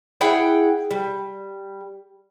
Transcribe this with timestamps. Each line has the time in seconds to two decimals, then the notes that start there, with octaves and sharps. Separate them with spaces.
0.21 E4 G#4 F#5 G5
0.91 G3